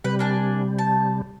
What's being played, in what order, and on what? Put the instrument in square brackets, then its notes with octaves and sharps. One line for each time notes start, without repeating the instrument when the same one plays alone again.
[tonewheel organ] C3 G3 [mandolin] B4
[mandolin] A#3 D4 G#5
A5